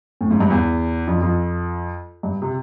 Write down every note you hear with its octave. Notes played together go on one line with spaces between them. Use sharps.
A2
G#2
G2
E2
F2
F2
G2
C3